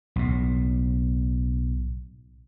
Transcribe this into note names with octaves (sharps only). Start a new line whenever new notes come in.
B1 A2